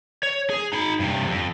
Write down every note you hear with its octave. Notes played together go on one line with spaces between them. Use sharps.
C#5
G#4
D#4 B5
G2 C3
F2